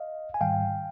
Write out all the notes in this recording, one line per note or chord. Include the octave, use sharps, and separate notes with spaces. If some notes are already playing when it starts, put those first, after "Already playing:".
Already playing: D#5 F5
G#5
G#2 D#3 G3 F5 G5